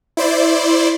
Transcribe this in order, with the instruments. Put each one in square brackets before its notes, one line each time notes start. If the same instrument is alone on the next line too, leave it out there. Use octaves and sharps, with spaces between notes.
[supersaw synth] E4 C5 D5